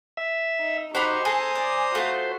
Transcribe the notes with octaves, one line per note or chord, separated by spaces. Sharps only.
E5
D#4
D#4 F#4 G4 C5 A#5 B5 C#6
G#4 A4 G#5 A#5 D#6
D5
A3 F4 F#4